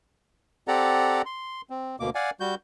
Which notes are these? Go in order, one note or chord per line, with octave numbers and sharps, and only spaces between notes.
C4 G4 A4 D5 F#5 A#5
C6
C4
D2 B2 A#3 D6
D5 F5 F#5 G#5
G3 F#4 G6